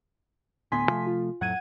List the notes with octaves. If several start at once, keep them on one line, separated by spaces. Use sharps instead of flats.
D2 A2 B3 G#5 C6 B6
C3 F3 A3
F4
F2 A2 F#3 F#5 G#6 D#7